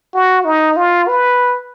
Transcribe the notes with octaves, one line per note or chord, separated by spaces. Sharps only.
F#4
D#4
F4
B4